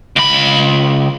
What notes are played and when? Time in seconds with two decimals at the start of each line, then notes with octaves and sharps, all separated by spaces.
0.16 C#2 B5